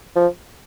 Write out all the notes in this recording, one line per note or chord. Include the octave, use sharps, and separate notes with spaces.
F3